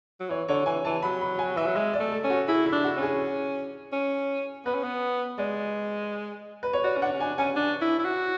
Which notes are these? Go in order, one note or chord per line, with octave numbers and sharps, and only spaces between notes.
F#3
E3 C#5
D3 C#5
E3 G#5
E3 A5
F#3 B5
B5
G#5
E3 E5
F#3
G#3 E5
D5
A3
A4
C#4
F#4
E4 G#4
E4
D4
F#4
C#4
G#4
C#4
B3 B4
C#4
B3
G#3 D5
B4
C#5
F#4 D5
C#4
D4 F#5
C#4
D4 G#5
C#4 G#5
D4
E4
E4
F#4